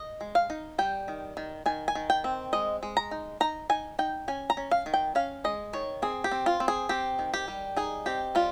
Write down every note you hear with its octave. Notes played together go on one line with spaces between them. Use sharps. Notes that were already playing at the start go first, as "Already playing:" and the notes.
Already playing: D#5
G#3
F5
D#4
G3 G5
D#3
D#3
D#3 G#5
G#5
D#3
G5
C4
G#3 D#5
G#3
A#5
D#4
D#4 A#5
D#4 G#5
D#4 G5
C#4 G#5
A#5
C#4
F5
D#3
G5
C#4 F5
G#3 D#5
D#3 C#5
C4 G#4
G4
C4
F4
C4
G#4
C4 G4
D#3
G4
G3
D#4 G#4
C4 G4
G3 F4